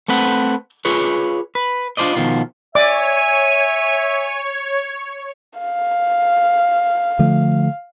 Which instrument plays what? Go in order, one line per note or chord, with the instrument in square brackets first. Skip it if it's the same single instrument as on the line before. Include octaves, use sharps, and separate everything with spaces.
[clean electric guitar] A3 C4 B4 F#5
F4 G#4 B4 C#5
B4
D4 F4 G#4 C5 D5 D#5
B2 D#3 F3 F4
[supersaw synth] C#5 [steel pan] D5 D6 [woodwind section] E5 G#5
[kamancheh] F5
[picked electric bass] D3 F3 A3